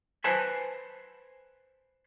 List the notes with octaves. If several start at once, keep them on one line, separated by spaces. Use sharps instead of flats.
B4 C5 G#5 A5 B5